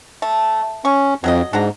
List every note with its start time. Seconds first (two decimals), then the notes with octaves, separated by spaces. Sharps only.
0.22 A3
0.85 C#4 C#6
1.24 F2 F#3 A#4 D#5
1.53 G#2 D4 F#4 A#5